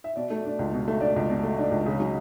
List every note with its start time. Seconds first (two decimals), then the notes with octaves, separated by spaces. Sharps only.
0.04 E5
0.16 B2 D5
0.30 A3
0.45 D4
0.59 C#2
0.73 B2
0.88 A3
1.01 D4 D5
1.16 C#2
1.30 B2
1.43 A3
1.58 D4
1.71 C#2
1.86 C#3
2.00 F#3